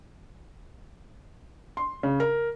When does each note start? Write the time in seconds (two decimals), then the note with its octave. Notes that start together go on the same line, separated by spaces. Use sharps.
1.77 C6
2.03 C#3
2.20 A#4